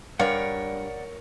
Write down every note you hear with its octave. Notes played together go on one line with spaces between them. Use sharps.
G2 A#4 C#5 D5 F5 F#5